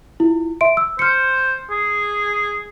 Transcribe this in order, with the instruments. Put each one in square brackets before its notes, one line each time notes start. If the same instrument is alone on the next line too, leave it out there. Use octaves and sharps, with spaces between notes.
[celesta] E4 F4
E5 C6 D7
E6
[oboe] C5 [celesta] F6 C#7
[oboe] G#4